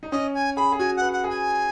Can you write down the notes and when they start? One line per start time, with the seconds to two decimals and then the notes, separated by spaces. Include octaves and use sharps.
0.03 D#4
0.11 C#4 D#5
0.35 G#5
0.57 G#4 B5
0.72 G#4
0.79 F#4 G#5
0.96 B4 F#5
1.13 F#5
1.24 G#4
1.29 G#5